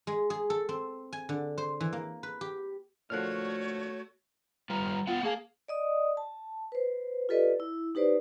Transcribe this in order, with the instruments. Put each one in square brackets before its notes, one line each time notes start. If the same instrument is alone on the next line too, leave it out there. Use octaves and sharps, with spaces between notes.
[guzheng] G#3
G#4
A4
C4
G#5
D3
C5
E3
A#3
B4
G4
[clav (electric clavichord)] A#2 D3 F3 [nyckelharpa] A3 F#4 [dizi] C#5 [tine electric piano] F6 F#6
[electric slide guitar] G3 F4 B4 [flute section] A#5 F6
[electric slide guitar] B3 F#5 G5 [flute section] F4
[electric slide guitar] A#3 F5 [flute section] G#4 A5
[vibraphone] D5 D#5 D#6
A5
B4 C5
F4 G4 A4 B4 D5 D#5
E4
D#4 G4 B4 C5 D5